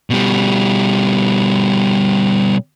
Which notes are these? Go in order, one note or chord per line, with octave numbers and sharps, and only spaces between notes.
B2 G3